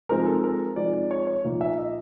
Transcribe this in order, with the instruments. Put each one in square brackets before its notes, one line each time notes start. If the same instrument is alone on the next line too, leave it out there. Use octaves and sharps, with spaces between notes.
[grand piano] F3 G#3 C4 D#4 A#4
A4
A#4
F3 G#3 C4 D#4 D5
D5
C#5
C#5
A#2 F3 A#3 D#4
E5
D#5